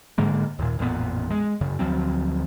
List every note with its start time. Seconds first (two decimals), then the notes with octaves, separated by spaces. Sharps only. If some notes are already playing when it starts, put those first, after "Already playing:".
0.18 G#2 D3 G#3 A#3
0.59 D#2 A#2
0.79 A1 F2 A#2 B3
1.30 G#3
1.61 F#2 C#3
1.79 D2 F3 F#3 C4